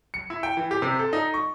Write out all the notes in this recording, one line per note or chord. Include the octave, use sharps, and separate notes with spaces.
C#7
E4
G5
E3
G4
C3
A4
D#4
C#6